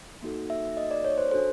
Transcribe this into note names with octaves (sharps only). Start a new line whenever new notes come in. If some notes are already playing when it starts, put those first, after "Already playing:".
A#3 D#4 F#4 A4
E5
D#5
D5
C#5
C5
D4 F#4 A4 C5